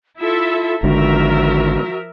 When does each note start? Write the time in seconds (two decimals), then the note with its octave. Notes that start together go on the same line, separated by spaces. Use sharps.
0.20 E4 F4 A4 E5
0.83 G#1 G#2 D3 F3 F#4 A#4 E5